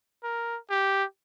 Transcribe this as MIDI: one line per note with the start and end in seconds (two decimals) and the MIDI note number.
0.24 0.57 70
0.70 1.04 67